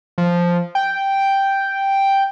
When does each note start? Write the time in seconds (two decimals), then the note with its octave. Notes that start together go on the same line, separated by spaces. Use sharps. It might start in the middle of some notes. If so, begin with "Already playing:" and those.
0.18 F3
0.75 G5